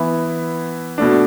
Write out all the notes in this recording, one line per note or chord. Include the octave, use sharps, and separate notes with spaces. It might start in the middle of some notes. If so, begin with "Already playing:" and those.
Already playing: E3 B3 E4
B2 A3 D4